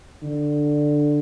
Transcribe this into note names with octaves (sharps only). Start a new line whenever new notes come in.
D3